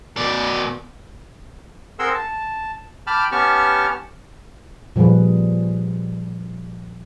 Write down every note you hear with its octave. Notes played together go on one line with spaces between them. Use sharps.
B2 D5
C4 G#4 A#4 F#5 C6 E6
A5
G5 A5 B5 D6 F6
B3 C#4 G4 A5 C#6 F6
A#2 F3 G3 G#4 B4